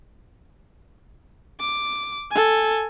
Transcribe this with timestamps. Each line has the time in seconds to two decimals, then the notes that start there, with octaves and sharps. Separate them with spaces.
1.60 D6
2.31 A4 G#5